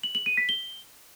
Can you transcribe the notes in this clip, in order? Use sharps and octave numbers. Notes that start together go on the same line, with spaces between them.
F#7
F#7
D#7
B6
G7